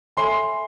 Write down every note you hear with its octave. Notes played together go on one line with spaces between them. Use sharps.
A4 C#5 E5 G#5 B5 C6